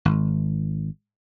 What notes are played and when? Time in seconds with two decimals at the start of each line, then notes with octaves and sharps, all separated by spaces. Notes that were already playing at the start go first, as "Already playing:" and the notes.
0.05 G#1